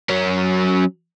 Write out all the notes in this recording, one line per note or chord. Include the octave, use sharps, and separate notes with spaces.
F#3 C#4